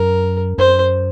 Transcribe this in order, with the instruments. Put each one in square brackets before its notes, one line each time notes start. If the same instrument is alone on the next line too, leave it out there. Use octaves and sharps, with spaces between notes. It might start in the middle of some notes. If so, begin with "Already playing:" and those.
Already playing: [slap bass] F#2 [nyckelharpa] A#4
[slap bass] F#2 [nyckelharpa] C5